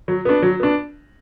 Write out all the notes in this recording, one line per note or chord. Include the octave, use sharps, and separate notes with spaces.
F#3
B3 D4
F#3
B3 D4